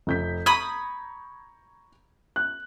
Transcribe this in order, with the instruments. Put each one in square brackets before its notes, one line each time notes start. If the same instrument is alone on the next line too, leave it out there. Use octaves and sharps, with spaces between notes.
[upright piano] F1 G6 B6
[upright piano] A#5 C#6 G#6 [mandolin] B5 D#6
[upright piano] F#6